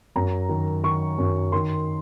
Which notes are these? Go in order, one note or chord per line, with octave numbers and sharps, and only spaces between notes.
F#2 A#5
D#3
D#3 C#6
F#2
D#3 C6